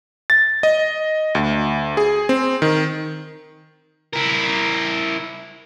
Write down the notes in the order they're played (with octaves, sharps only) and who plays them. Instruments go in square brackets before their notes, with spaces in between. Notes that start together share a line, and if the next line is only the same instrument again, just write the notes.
[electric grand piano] A6
D#5
D2
G#4
C4
D#3
[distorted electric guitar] E4 A#4